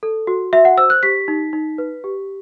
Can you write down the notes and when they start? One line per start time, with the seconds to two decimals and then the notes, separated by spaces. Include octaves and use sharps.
0.03 A4
0.27 F#4
0.53 F#4 E5
0.65 F#5
0.77 C5 E6
0.90 F#6
1.03 G4 B6
1.28 D#4
1.53 D#4
1.78 B4
2.04 G4